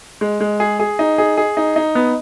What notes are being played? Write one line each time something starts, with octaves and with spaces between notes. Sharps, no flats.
G#3
G#3
G#4
G#4
D#4
G#4
G#4
D#4
D#4
B3